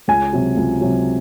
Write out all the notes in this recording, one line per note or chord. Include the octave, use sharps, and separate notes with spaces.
C#2 G#5
C3 F#3
C#2
C3 F#3